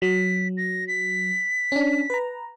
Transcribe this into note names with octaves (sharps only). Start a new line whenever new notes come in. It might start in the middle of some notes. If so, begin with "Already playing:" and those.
F#3 B6
A#6
B6
C#4 D4
B4 A#5